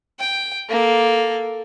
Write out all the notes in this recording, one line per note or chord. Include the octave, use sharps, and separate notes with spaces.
G5
A#3 A4